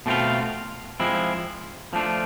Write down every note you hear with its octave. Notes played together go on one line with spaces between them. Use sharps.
B2 A3 C4 F4
F3 G#3 C4 E4
F3 A3 D4 F4